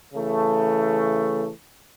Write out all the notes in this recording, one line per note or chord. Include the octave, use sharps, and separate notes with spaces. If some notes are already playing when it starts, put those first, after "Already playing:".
C#3 E3 A3